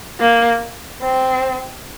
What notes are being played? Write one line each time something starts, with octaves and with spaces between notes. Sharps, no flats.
A#3
C4